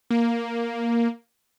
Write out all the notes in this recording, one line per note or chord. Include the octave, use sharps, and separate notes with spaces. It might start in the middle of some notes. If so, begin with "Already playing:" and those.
A#3